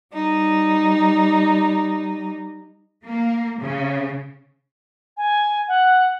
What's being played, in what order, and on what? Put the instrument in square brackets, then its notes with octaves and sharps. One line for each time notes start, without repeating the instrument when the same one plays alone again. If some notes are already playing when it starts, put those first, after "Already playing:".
[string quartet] G3 D#4
[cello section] A#3
C#3
[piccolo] G#5
F#5